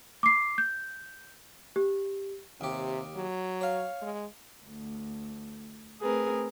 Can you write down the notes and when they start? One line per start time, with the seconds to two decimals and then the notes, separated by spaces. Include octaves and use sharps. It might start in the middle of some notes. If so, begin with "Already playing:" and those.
0.23 D6 C7
0.58 G6
1.76 G4
2.61 D#2 C3 G4
3.16 F#3
3.61 C#5 F5
4.02 G#3
4.64 D2
6.01 A3 C4 G#4 A#4 B4